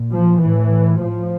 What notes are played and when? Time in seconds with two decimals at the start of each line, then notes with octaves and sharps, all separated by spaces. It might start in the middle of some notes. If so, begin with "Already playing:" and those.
Already playing: A#2
0.11 F3
0.40 A2 E3
1.00 A2 F3